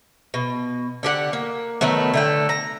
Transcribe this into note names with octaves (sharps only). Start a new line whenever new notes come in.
B2
D3 G4 G#4 F#5
A#3
D#3 F#3 A3 B3
D3 A3 G5
A#5